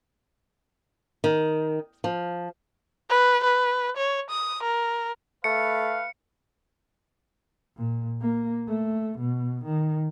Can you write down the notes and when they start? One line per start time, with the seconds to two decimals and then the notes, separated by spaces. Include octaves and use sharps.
1.24 D#3
2.04 F3
3.10 B4
3.44 B4
3.97 C#5
4.30 D#6
4.63 A#4
5.44 A3 B4 F5 C#7
7.76 A#2
8.21 A#3
8.67 A3
9.19 B2
9.65 D#3